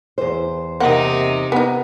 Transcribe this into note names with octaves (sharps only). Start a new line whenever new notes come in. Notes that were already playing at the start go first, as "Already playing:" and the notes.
E2 C5
C3 A#3 C4 D#4 F#5
B3 D#4